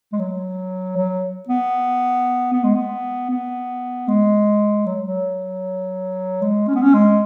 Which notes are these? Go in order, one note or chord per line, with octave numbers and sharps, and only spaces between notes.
G#3
F#3
F#3
B3
B3
G#3
B3
B3
G#3
F#3
F#3
G#3
C#4
B3
C#4
G#3